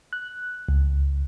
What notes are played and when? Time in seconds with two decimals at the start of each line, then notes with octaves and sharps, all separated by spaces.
0.13 F#6
0.69 C#2